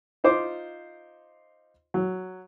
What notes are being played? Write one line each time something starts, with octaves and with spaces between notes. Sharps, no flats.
D#4 F4 C5 D6
F#3